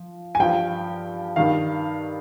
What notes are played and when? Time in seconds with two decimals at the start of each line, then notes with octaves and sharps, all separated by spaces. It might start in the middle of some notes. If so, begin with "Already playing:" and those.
Already playing: F3
0.35 G#5
0.40 G2 F3 G5
1.36 G2 D#3 F5